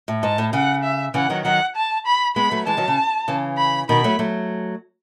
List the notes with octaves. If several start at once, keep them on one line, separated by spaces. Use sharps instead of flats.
A2
G#2 A5
A2
C#3 F#5
E5
C#3 E3 F#5
D#3 F#3
D#3 F#3 F#5
A5
B5
G#3 B3 B5
F#3 A3
E3 G#3 A5
D#3 F#3
C#3
C#3 E3
B5
B2 D#3 B5
F#3 A3
F#3 A3